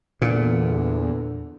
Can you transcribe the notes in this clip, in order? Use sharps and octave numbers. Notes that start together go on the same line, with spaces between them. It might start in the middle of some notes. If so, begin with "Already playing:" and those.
E2 A#2 D3